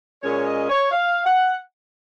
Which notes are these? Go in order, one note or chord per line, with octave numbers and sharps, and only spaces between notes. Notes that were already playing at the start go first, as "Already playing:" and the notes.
A#2 G#3 C#4 C#5
D#5
C#5
F5
F#5